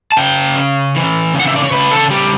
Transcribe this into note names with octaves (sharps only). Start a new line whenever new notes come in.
A5
C#3 G5
C#4
E3
C#3
F#5
E5
D5
C#5
C#3 B4
A4
G3 G4